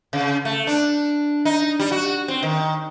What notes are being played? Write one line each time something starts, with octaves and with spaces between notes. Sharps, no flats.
C#3
A3
D4
D#4
G3
F#4
C4
D#3